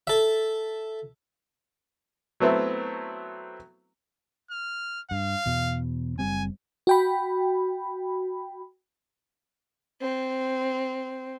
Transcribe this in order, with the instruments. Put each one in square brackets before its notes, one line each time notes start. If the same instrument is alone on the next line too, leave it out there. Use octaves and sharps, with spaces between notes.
[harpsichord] A4 E5
[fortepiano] F#3 A3 B3 C4 E4
[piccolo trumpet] F6
[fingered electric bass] G2 [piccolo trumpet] F5
[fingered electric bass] E2 B2
[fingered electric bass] F#1 G3 C4 [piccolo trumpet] G#5
[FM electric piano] F#4 G5 B5
[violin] C4